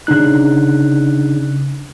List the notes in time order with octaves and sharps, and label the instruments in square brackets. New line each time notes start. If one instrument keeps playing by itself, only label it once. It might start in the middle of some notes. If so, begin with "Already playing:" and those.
[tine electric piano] C#3 D4 D#4 F#6